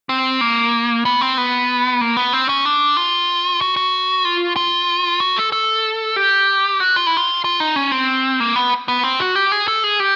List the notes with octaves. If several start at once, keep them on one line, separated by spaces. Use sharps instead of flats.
C4
A#3
B3
C4
B3
A#3
B3
C4
C#4
D4
F4
F#4
F#4
F4
F4
F#4
A4
A4
G4
F#4
F4
E4
F4
F4
D#4
C#4
C4
A#3
B3
B3
C4
F#4
G4
G#4
A4
G#4
G4